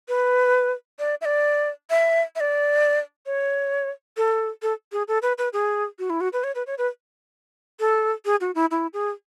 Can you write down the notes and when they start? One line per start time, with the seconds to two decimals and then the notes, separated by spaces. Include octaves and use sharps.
0.08 B4
0.99 D5
1.21 E5
1.25 D5
1.90 E5
2.36 E5
2.40 D5
3.26 C#5
4.17 A4
4.62 A4
4.92 G#4
5.08 A4
5.22 B4
5.38 B4
5.53 G#4
5.99 F#4
6.10 E4
6.21 F#4
6.33 B4
6.44 C#5
6.55 B4
6.67 C#5
6.78 B4
7.80 A4
8.25 G#4
8.41 F#4
8.55 E4
8.71 E4
8.93 G#4